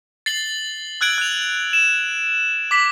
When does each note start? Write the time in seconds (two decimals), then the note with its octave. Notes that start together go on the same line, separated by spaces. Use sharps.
0.26 A6 C7 F#7 G7
1.01 E6 F#6 G#6 D7 F#7
1.18 F#6 F7
1.73 E7
2.71 D6 B6 F#7